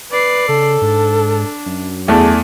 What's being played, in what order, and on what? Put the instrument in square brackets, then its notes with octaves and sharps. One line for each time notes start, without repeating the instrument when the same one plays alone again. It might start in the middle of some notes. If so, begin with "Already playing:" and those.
[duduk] B4 [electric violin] D5 C7
[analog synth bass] C#3 [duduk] A4
[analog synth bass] G#2 [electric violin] D4
[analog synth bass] F#2
[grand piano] E2 A3 [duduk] G#4 [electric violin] D5